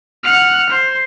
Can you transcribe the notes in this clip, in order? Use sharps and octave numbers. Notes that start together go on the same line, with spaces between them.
F#5 F6
C5